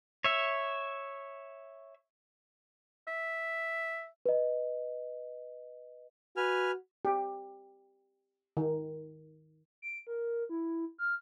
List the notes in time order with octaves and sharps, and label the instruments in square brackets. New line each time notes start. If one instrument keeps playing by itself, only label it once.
[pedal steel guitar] C#5 E5
[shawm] E5
[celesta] B4 D#5
[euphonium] F#4 [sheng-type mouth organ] B4 G#5 F6
[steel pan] G4
D#3
[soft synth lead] D7
A#4
E4
F6